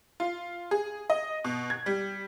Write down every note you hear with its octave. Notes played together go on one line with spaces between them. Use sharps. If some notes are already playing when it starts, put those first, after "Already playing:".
F4
G#4
D#5
B2
G#6
G3